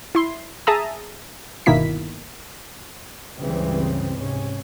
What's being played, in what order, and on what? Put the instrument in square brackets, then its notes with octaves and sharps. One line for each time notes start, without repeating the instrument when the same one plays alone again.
[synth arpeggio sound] E4 C6
G#4 E5 A5 A#5 D#6
G1 B2 D#3 A#3 E4 B6
[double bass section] C#2 G2 C#3 E3 G3 C4
G#2 C3 C#4